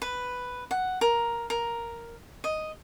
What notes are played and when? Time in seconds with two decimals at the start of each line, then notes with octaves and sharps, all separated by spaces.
0.02 B4
0.71 F#5
1.01 A#4
1.50 A#4
2.44 D#5